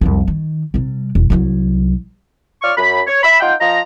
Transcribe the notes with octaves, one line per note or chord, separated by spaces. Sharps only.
C2 F2
D#3
C3 G3
E1
C2 F#3
F4 C#5 D5 C#6 F6
F#2 B5
C#5
E5 B5
D#4 F4 F#5 G5
F3 D#5 A#5